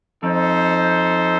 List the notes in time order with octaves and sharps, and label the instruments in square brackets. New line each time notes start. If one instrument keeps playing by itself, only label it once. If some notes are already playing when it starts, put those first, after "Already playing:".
[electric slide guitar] F2 [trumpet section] D#4 A4 C5